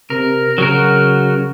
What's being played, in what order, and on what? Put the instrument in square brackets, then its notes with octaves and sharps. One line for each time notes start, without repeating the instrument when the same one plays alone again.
[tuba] C3 [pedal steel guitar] A#4
[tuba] C#3 [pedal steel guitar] F#3 F#4 A#4